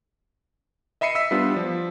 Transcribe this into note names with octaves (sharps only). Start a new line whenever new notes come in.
D#5 E5 B5 C7 C#7 D#7
E6 B6
G3 B3 D4 F4
F3